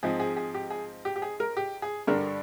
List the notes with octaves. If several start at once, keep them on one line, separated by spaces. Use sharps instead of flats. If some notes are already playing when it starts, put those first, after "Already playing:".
G#2 F3 C4 D#4 G#4
G#4
G#4
G4
G#4
G4
G4
G#4
A#4
G4
G#4
G2 D3 G3 D4 A#4